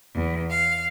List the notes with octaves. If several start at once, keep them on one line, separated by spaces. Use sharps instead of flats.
E2
F5